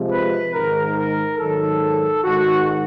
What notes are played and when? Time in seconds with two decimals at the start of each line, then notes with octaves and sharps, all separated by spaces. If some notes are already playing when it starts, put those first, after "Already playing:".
Already playing: C3 F3 G#3
0.12 B4
0.54 G#2 D#3 G#3 A#4
0.96 A#4
1.38 G#2 D#3 F#3 A4
2.23 G#2 D#3 G#3 F#4